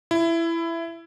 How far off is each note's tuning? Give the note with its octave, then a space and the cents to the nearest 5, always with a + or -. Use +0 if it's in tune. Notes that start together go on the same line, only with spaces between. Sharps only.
E4 +15